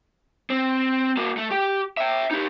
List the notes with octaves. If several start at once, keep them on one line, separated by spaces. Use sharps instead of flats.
C4
A#3 F#4
A3
G4 G5
E5 G5
D#4 G4